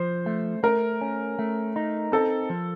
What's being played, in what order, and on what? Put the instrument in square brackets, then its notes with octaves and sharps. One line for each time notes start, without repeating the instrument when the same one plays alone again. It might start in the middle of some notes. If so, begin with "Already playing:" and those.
Already playing: [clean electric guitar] F3 [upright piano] C5
[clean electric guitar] A3
[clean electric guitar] A3 [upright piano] A#4
[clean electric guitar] C#4
A3
D#4
[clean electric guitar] C4 [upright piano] A4
[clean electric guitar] F3